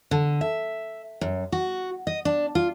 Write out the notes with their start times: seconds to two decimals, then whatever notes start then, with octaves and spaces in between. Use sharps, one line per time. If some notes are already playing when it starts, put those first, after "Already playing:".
0.11 D3
0.41 E5
1.21 F#2
1.52 F#4
2.07 D#5
2.25 D4
2.55 F4